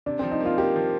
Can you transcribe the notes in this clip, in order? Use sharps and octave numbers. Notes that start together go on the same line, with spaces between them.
C3 D4
F3 C4
D#4
A#3 F4
A#3 G4
F3